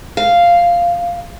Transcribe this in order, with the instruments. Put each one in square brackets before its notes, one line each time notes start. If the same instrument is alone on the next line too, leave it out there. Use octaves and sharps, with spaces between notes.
[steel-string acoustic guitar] F5